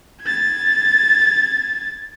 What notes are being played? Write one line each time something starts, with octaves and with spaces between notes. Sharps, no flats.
G#6 A6